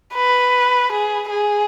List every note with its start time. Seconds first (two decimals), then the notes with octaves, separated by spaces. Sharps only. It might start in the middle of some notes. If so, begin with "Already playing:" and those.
0.14 B4
0.92 G#4
1.30 G#4